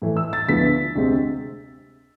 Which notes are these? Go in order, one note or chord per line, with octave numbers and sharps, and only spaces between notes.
A2 E3 A3
E6
A6
D2 D3 F3 B3 E4 B6
D2 C3 G#3 C4